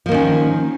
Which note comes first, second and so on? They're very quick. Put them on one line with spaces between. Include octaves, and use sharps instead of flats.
F3 A#3 D#3 C#4